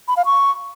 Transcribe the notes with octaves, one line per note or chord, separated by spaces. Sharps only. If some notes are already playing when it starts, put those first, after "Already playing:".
B5
F5
C#6